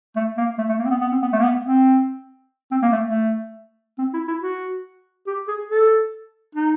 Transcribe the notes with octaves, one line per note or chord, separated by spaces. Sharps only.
A3
A#3
A3
A3
A#3
C4
B3
B3
C4
B3
A3
A#3
B3
C4
C4
A#3
A3
A3
C4
E4
E4
F#4
G4
G#4
A4
D#4